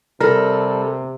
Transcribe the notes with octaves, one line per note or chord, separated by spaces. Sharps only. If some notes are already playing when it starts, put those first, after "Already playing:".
C3 G3 A4 A#4